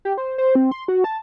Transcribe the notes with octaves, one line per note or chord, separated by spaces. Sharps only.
G4
C5
C5
C4
C6
F#4
A5